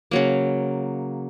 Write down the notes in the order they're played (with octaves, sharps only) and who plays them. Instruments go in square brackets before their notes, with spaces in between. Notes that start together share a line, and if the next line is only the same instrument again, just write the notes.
[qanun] C#3 F#3 A#3